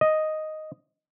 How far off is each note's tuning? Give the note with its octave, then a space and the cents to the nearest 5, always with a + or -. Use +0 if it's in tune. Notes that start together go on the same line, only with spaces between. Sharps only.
D#5 +0